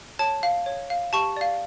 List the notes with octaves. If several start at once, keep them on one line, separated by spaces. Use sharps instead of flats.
C#5 A5
F5
C#5
F5
G4 A5 C#6
D5 F5